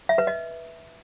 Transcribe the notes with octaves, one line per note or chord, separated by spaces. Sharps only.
E5
B4
D#5